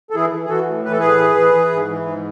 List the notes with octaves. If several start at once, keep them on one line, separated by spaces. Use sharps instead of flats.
A4
E3 E4 G#4
E3
G#4
E3 F#4 A4
A2
E3 B4
A4
A2 G#4 B4
E3
E3
E3
G#2
E3
G#2